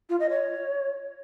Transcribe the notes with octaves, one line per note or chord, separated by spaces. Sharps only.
F4
D#5
C#5